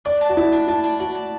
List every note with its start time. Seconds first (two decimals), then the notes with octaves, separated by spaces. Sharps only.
0.05 D4 D5
0.21 A5
0.29 F#4
0.37 E4 A5
0.52 D4
0.68 E4 A5
0.84 D4
1.00 F#4 D5
1.15 A5